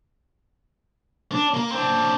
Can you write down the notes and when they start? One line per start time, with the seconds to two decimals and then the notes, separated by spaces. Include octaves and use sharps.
1.32 D4
1.54 A#3
1.72 C4 D4